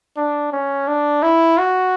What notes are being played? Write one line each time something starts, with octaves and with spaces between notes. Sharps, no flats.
D4
C#4
D4
E4
F#4